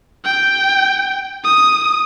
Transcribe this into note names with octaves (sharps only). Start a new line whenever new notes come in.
G5
D#6